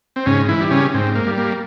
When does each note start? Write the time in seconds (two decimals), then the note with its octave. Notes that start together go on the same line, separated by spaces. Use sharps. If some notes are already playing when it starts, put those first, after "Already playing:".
0.16 C4
0.26 G#2 C#3 C#4
0.48 E3 E4
0.61 G3
0.71 C#3 C#4
0.94 G#2 C4
1.15 A#3
1.27 G3
1.38 A#3